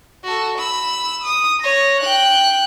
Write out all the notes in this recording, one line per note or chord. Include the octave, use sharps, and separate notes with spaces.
F#4 A4
B5 E6
D#6
C#5 A#6
G5 F#6